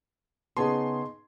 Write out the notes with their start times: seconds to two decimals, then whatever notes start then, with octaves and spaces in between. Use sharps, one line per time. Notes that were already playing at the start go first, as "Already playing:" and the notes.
0.57 C#3 B3 D#4 G#4 A5 C6